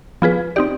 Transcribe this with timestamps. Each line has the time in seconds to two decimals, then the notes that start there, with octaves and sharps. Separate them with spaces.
0.22 F3 B3 F4 G#4 B4
0.56 C4 D#4 G4 D5